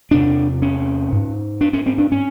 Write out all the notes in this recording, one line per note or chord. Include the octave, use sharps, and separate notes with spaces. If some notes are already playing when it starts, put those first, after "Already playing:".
E2 C3 D4
C#4
G#2
D4
C#4
C4
D4
C#4